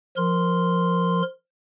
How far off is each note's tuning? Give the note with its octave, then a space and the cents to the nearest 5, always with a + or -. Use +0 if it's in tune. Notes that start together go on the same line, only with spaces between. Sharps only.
F3 +0 A#4 +0 C6 -5